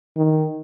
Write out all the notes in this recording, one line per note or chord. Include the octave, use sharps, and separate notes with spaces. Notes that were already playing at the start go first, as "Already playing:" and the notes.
D#3